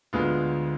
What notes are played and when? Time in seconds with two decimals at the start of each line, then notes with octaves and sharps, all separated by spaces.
0.13 D2 D3 G#3 B3 F4